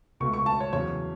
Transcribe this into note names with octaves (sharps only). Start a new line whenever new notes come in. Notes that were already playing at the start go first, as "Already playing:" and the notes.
C#2 B2 A3 C#6
C#6
A5
C#5
E2 C#3 F#3 C#5